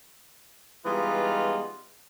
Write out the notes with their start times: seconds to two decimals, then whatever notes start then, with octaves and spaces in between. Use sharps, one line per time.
0.86 E3 G3 G#3 B3 D#4 F4